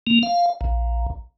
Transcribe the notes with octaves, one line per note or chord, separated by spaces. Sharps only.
A#3
F5
A#1